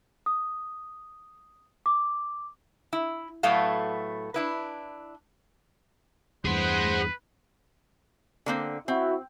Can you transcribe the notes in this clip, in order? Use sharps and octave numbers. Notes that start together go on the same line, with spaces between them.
D#6
D6
E4
A2 F#3 A3 B3 A4 F5
D4 E4 B4
E2 G2 E3 G#4 B4 C5 F#5 C6
D3 A#3 C4
C4 E4 F#4